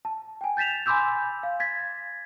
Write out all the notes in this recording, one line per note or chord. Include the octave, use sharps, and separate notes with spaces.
A5
G5 G#5
G6 A6 B6 E7 F7
G#5 B5 C6 D6 E6 G6
F5
G#6 A6 B6